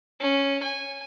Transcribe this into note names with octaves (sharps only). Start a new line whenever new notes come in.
C#4
G#5